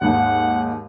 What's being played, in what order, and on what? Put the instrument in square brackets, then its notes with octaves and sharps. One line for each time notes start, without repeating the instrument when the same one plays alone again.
[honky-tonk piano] D#2 G#2 [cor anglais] F#5